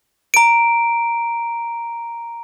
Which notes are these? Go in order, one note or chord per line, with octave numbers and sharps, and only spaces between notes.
A#5 D7